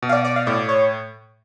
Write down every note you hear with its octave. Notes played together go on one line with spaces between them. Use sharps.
B2
F5
D5
D5
F5
A2 D5
C#5